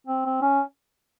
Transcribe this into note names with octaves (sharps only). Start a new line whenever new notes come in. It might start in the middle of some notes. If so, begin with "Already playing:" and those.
C4
C4
C#4